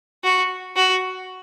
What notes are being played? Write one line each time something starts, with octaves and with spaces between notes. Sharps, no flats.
F#4
F#4